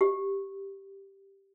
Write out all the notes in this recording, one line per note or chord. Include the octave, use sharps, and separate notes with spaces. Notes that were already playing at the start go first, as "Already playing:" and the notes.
G4